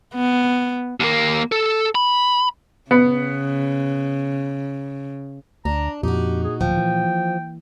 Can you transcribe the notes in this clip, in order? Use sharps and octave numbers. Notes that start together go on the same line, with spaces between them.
B3
D#2 A#3
A4
B5
C#3 B3
D2 D4 A#5
F2 A#2 D#4 F#4 G4
G#4
D1 F3 G5
E3 A#3